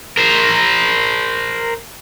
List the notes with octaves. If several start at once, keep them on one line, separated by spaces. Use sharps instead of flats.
A#4 C5